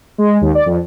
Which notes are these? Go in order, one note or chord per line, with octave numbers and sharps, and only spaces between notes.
G#3
D#2
D5
F2